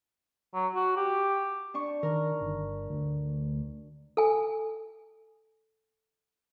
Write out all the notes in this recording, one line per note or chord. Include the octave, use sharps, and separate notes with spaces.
F#3
F#4
G4
D4 C#6
D#3 A#4
G1
D2
A4 G#5